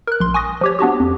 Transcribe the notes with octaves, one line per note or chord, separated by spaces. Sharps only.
A#4 F#6
A#1 C6
G#5 C#6 D#6 A#6
F3 G4 C#5
B3 D4 F#4 G4
F2